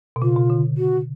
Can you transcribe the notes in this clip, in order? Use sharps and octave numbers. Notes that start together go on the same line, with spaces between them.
B2
C#3 F4
B2
D3
F#4